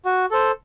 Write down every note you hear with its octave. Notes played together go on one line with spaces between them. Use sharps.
F#4
A4 C5